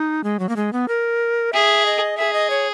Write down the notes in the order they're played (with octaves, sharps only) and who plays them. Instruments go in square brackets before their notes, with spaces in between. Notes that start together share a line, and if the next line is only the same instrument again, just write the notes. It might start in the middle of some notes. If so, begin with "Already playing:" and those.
Already playing: [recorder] D#4
G#3
F#3
A#3
G#3
B3
A#4
[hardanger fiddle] G#4 [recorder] E5
[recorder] D#5
[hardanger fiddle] G#4 [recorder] E5
[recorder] D#5
C#5